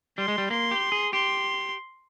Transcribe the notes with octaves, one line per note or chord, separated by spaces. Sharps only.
G3 C6
G#3
G3
A#3 C6
G4
G#4
G4 C6